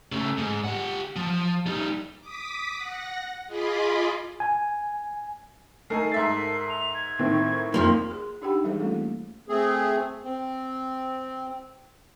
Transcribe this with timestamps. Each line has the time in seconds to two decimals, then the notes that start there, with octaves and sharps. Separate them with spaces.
0.12 C#3 A3
0.38 G#2
0.64 G4 F#5
1.16 F3
1.66 G3 D#4
2.20 D6 D#6 B6
2.77 F#5 A#6
3.46 F4 G#4 D#5 B5 C6 D6
4.40 G#5
5.90 A3 D#4 A4 A#4 G#5 A5 C7
6.12 G#2 E5 A6 C7
6.70 F7
6.94 G#6
7.19 A2 D#3 C4
7.74 F2 F3 A#3
8.10 G#4 C6
8.42 D4 D#4 G4 F#5 G5 B5
8.64 E3 G3 G#3 G#4 A4 C5
8.79 E3 A3 A#3 C#4 F4
9.49 A3 C4 G#4
10.24 C4